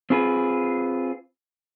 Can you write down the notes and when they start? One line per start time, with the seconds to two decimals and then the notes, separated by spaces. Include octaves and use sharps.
0.10 C4 F4 G#4 B4